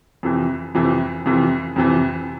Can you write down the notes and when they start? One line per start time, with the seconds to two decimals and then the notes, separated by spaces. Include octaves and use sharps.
0.23 F2 C3 E3
0.75 F2 C3 E3
1.26 F2 C3 E3
1.76 F2 C3 E3